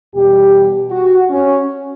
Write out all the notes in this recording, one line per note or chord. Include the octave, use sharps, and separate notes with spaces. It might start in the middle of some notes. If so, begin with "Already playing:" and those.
E2 B2 G3 G4
F#4
C#4